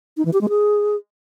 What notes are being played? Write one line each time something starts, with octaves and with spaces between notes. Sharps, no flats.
D#4
E3
G4
G#3
G#4